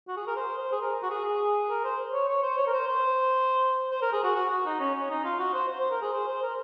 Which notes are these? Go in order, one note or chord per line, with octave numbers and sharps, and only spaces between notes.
F#4
G#4
A#4
C5
C5
G#4
A#4
F#4
G#4
G#4
A#4
C5
C#5
C#5
C5
C#5
A#4
C5
C5
C5
A#4
G#4
F#4
F#4
F#4
D#4
C#4
C#4
D#4
F4
F#4
C5
C5
C5
A#4
G#4
C5
C5
A#4